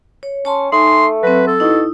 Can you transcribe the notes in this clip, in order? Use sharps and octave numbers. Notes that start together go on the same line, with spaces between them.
C#5
C#4 C#5 A5 C6
A3 D#4 G#5 C6
F#3 C4 B4
A4
B2 D#4 E4